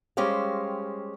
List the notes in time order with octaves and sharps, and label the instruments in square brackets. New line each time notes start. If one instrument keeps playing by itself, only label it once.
[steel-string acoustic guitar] G3 G#3 C#4 G4 C5 F5